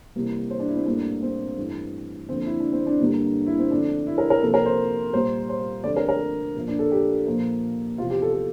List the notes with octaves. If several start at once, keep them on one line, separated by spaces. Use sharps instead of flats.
C3 E3 G3 A#3
C5
D4
E4
C4
A2 G3 A#3 D4
C4
G2 E3 A3
F2 D3 F3 A#3 C4
E4
D4
C4
D4
G2 D3 G3 A#3
E4
C4
F2 D3 A3 D4
E4
A#4
A#4
C3 F3 A#3 A4
A#4
C5
A#2 G3 A#3 C5
C5
F2 D3 A3 D5
A#4
A#4
A#2 F3 A#3
D4
A4
G4
A#2 F3 A#3
E2 C3 F3 F4
G4
A4
A4